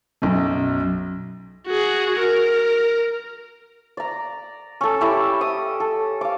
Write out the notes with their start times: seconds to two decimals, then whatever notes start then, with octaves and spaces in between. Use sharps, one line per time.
0.22 B1 F#2
1.67 F#4 G#4
2.19 A#4
3.97 D5 A#5
4.81 C#4 A4
5.01 C#4 E4 G4 D5
5.41 D#6
5.80 A4
6.21 F5 D6